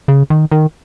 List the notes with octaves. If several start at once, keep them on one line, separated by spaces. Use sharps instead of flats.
C#3
D#3
D#3